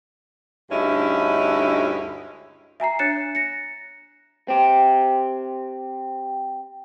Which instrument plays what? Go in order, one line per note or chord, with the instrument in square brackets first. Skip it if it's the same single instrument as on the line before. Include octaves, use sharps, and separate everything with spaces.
[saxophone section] D2 G2 G#3 C#4 D#4 E4
[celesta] E5 G#5 A#5 C7
D4 C#5 F#6 A6 C#7 E7
A#6 C#7
[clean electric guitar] C4 G4